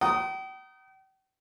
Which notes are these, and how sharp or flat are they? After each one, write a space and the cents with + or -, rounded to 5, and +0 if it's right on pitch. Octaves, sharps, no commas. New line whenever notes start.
G5 -40 A#5 +0 D#6 +0